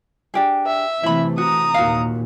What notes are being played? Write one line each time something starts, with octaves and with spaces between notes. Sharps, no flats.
D4 G4 G#4
E5
C3 E3 A3 E4 B5
F#4 A#5 D#6
D#2 A#2 F#4 F5